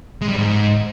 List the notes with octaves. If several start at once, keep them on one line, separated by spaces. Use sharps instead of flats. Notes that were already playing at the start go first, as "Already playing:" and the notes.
G#3
G3
G#2